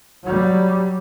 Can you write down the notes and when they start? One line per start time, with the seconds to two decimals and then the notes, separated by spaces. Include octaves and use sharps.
0.23 F#3 G3